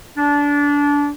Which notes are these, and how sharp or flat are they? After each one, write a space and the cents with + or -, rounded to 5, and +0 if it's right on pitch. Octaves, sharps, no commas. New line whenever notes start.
D4 -25